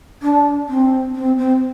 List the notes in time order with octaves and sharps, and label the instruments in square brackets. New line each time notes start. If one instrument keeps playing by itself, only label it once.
[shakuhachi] D4
C4
C4
C4